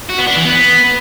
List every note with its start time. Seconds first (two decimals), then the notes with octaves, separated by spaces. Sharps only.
0.10 F#4
0.18 B3
0.27 D4
0.36 E3
0.45 B3